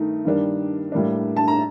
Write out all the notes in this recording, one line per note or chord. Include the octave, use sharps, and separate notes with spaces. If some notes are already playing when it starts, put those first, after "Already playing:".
Already playing: G2 D#3 A3 D#4
G2 D#3 G3 A#3 D4
A2 G3 A#3 D4
A5
A#5